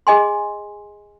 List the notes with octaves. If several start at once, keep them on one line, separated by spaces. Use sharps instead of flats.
G#4 D#5 G#5 C6